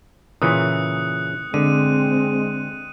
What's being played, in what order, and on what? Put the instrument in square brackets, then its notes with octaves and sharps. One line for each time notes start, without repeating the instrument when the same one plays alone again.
[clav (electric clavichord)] A#2 C#3 E3 [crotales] D#6 F#6 C#7
[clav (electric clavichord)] D3 [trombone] G#3 [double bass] C4 [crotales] D#7